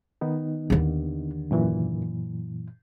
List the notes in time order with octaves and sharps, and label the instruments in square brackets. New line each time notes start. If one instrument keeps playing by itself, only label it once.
[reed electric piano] D#3 B3 D#4
[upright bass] D#2 D3
[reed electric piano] F#2 A#2 E3